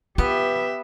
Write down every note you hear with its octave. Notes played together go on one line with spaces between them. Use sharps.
B3 F4 G4 E5